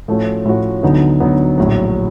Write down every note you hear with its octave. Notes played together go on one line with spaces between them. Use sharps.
A2 F3 A3 C#4 F#4
A2 F3 A3 C#4 F#4
D2 D3 F#3 B3 D#4
D2 D3 F#3 B3 D#4
A#1 A2 F#3